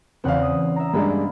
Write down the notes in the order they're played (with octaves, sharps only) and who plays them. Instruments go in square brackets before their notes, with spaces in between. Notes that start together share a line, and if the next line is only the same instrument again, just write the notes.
[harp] E2 C#3 F#5 [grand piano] C4 F5
[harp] D#6
E5 A#5
[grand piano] G2 G#3 D4 [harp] A#3 B5